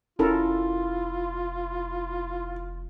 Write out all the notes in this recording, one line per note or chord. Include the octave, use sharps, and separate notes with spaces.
F1 C#4 E4 F4 A4 A#4